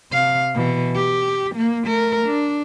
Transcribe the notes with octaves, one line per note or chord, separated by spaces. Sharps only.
C3 F5
B2 E3
G4
A#3
A3 A#4
D4